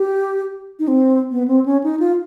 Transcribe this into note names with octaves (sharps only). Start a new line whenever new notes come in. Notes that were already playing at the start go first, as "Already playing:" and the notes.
Already playing: G4
D#4
C4
B3
C4
C#4
D#4
F4